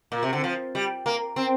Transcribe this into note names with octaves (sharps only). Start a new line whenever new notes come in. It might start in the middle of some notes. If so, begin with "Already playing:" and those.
A#2
C3
D3
F3
G3
A#3
C4